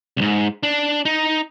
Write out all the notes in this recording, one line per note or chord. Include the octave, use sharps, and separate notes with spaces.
C2 G#2
D4
D#4